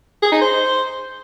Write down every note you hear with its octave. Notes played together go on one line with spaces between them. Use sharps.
G#4
D#4
C5